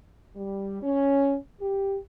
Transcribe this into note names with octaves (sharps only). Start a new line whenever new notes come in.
G3
C#4
G4